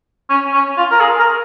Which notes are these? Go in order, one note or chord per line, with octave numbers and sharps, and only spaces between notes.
C#4
C#4
F4
A#4
G#4
A#4